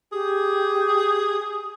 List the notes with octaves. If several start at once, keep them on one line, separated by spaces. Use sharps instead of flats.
G4 G#4